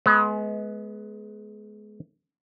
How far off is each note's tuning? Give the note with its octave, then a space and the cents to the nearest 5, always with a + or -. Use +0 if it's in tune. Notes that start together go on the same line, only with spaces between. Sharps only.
G#3 +30 B3 +0